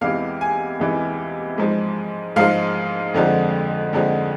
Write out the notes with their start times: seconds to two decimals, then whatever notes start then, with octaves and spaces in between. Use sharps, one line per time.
0.01 E2 C3 E3 G#3 F5
0.41 G#5
0.80 E2 C3 E3 G#3
1.58 G#2 F3 G#3
2.36 G#2 F3 G#3 F5
3.14 F2 D3 F3 G#3
3.93 F2 D3 F3 G#3